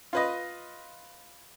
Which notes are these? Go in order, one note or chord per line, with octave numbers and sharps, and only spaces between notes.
F4 B4 D#5